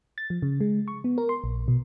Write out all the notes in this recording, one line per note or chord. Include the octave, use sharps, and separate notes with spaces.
A6
F3
C#3
G#3
C#6
B3
A#4
C6
A#1
B2